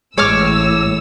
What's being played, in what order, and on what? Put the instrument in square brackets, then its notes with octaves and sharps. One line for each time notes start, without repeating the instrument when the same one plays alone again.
[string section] A1 A2 E6 [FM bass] G#3 [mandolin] C#5 D6 F6